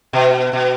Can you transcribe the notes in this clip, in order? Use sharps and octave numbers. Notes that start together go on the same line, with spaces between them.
B2
B2